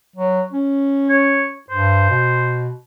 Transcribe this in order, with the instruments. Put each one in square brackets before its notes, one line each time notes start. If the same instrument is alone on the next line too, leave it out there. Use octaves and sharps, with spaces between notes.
[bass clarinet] F#3
C#4
[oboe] C#5
[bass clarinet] G2 [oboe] C5
[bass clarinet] B2